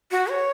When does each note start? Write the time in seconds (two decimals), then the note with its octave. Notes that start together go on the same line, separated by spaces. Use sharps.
0.11 F#4
0.30 C#5